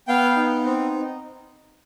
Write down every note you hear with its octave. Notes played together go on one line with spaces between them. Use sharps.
B3 F5 G5
D#4
C4